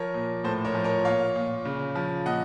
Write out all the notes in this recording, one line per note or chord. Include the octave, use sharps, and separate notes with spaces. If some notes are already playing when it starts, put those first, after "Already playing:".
Already playing: F3 A#4 C#5
A#2
A2 A4 C5
A#4 C#5
F3
A#4 C#5
A#2 C#5 F5
A#2
C#3
F3
A#2 D#5 F#5